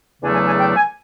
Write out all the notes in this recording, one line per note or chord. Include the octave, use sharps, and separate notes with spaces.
E2 C#3 F#3 A3 D4 G#5
G#5
G#5
G5
G#5